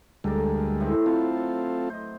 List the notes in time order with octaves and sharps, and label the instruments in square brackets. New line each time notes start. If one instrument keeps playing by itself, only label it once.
[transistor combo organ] D2 G3 G#3 [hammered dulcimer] A4 A#4 D5
[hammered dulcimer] A2 E3 C4
[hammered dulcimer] F#3 [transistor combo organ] C4 F4 A4
[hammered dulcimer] C5 D#5